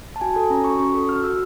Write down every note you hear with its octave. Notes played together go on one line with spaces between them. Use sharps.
A5
F#4 G#5
A4 G#5
C#4 A#5
F#4 C#6
C#4 C#6
A4
F#4 F6
F#4 E6